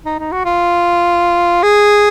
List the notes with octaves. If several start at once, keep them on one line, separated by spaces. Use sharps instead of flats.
D#4
D#4
F#4
F4
G#4